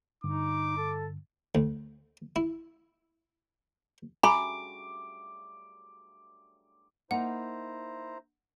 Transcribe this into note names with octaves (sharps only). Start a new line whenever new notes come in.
G2 D3 D#4 D6
A4
D2
E4
G#5 A#5 B5 D6
A#3 D#4 E4 C5 F#5 A#5